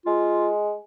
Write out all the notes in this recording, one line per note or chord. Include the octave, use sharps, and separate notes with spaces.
G#3 F4